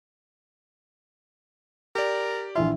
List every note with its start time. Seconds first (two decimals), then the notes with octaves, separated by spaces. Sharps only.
1.95 G4 A#4 D5
2.55 A#1 E3 F4 E5